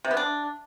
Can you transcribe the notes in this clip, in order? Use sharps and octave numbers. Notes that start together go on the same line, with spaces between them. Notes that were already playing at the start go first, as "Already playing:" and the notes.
C3
B3
D4